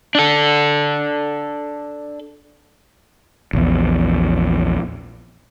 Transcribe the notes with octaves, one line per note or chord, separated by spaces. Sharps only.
D4 A4
A#1 E2